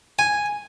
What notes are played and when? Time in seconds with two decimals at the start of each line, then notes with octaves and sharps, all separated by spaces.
0.19 G#5